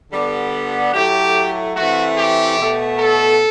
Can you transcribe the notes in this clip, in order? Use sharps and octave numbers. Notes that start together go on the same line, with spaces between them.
D3 G3 B3
A2 F#3 A3 G4
C3 E3 A3 F#4
G4
B2 A3
A4